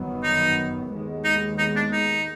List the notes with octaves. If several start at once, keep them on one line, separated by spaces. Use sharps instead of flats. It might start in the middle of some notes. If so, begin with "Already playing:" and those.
Already playing: G1 F#2 D#3 F#3 B3
D#4
D#2 D#3 G#3 B3
D#4
D#4
D4
D#4